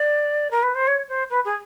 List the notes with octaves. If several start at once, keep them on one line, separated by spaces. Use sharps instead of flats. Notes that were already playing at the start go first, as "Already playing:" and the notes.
Already playing: D5
A#4
B4
C5
C#5
C5
B4
G#4